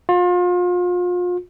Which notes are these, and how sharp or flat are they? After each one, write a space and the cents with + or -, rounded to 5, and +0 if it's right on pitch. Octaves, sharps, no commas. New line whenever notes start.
F4 +35